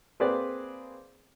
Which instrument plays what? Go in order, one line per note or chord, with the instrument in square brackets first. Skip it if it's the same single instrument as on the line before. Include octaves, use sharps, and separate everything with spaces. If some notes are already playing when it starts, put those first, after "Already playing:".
[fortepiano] A#3 C4 G#4 B4 D5